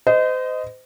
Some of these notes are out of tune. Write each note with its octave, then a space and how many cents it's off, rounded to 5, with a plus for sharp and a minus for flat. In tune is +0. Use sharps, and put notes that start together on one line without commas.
C5 -35 D#5 +0